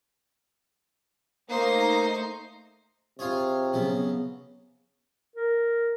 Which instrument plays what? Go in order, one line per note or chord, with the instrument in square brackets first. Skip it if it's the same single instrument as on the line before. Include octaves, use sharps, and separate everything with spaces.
[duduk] A3 [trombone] A#3 [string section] D#4 [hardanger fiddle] C5
[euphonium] C3 [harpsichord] F4 G#4 C#5
[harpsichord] C#3 F#3 B3
[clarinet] A#4